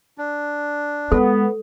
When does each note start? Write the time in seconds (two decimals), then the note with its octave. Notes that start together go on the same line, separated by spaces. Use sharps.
0.18 D4
1.12 G#3 B3 A4